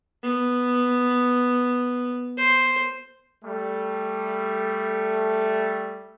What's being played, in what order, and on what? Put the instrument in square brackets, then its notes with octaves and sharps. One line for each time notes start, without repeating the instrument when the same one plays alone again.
[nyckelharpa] B3
C5
[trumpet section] G3 A3